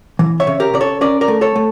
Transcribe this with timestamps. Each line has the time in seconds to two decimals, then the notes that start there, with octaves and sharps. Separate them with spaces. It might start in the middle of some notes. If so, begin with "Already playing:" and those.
0.19 E3
0.40 C#5 E5
0.47 C#3
0.60 G4 A#4
0.74 C#3 D5
0.81 A4 C#5
1.01 C#4 A#4 D5
1.21 A#4 D5
1.28 A3
1.41 A4 C#5
1.56 A3